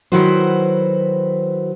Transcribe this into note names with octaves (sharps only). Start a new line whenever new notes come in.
D#3 F#3 E4 F#4 B4 C5